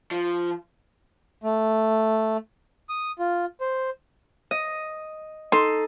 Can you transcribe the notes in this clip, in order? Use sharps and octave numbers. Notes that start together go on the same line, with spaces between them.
F3
A3
D#6
F4
C5
D#5
D#4 A4 C6